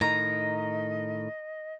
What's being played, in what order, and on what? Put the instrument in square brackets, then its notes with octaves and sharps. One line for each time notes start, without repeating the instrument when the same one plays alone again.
[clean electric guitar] A2 D#3 D#4 [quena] D#5 [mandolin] A#5